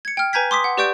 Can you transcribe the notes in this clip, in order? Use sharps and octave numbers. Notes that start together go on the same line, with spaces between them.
G#6 C#7
G5 F6
B4 G#5 A#5 G6 G#6 B6
C6 D6 D#6 B6
F#5
G4 B4 D5 C#6 G6 D7